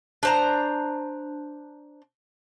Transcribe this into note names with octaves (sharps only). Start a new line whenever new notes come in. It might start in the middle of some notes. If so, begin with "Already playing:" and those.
D4 C5 A#5